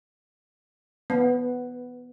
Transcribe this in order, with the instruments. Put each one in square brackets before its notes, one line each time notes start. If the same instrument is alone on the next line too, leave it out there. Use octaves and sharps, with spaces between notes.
[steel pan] B3